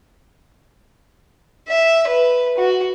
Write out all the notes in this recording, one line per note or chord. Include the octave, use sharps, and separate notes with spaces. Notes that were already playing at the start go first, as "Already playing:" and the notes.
E5
B4
F#4